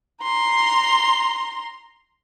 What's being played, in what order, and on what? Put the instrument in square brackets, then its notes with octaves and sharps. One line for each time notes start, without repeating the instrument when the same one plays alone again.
[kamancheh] A#5 C6